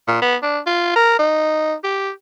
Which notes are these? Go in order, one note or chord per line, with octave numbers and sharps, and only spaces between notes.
A#2
B3
D4
F4
A#4
D#4
G4